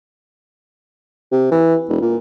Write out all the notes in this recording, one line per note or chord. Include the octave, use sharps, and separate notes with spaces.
C3
E3
E1
A#2